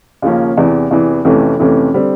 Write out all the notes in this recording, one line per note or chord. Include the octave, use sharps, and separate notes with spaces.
D#2 C#3 F3 A#3 C#4
E2 C3 E3
E2 C3 E3
F2 C3 E3 A3 C#4
F2 C3 E3 A3 C#4
D3 G3 C4